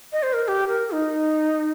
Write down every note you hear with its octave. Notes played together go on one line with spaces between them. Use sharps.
D#5
C5
A#4
A#4
G4
A#4
D#4